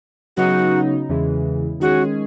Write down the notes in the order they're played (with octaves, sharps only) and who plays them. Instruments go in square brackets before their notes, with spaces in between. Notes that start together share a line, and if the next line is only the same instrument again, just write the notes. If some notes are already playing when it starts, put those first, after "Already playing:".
[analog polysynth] C#3 F#3 B3 D#4 [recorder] F#4
[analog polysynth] E2 C#3 E3 G#3
[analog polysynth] D#3 G#3 C#4 G#4 [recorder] F#4